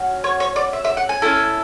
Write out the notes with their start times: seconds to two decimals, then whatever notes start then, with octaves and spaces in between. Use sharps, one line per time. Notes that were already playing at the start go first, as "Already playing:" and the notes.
Already playing: C#4 F#4
0.24 C#5
0.40 C#5
0.56 D5
0.73 E5
0.85 E5
0.97 F#5
1.09 G#5
1.22 C#4 E4 A4